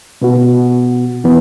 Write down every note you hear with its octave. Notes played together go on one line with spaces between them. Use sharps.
B2 B3 F#4
E3 B3